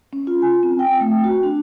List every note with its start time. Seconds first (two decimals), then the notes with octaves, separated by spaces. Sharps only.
0.13 C#4
0.27 F4
0.42 G#5
0.63 C4
0.79 G5
1.00 A3
1.24 F#4
1.43 D4